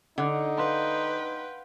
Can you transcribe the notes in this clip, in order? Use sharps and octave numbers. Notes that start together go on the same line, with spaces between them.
D3 D#4 F#5
B4 F5 G5 C6